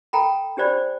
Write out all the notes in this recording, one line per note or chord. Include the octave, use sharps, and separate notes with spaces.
A4 G5 A#5 B5
D4 G4 C5 D5 B5